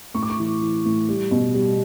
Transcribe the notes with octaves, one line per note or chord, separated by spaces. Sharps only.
A2 C#6
D6
C#6
E3
E3
A2
G3
B2
G3